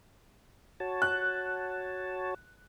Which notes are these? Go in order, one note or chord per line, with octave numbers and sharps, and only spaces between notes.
F#4 C#5 A5
F#6